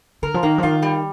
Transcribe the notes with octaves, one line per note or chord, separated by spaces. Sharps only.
D3 A#4
F3
D#3 A#3
F3
D#3 F4
G3